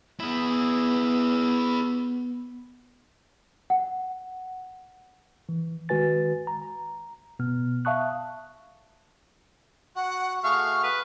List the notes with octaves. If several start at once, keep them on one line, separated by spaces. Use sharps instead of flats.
B3 E4 G#4
F#5
E3
D#3 G#3 F#4 B4 G#5 A6
A#5
B2 B3 F6
E5 F5 A5 C#6 D#6 F#6
F#4 F#5
A3 F#4 G#4 F5 C#6
B4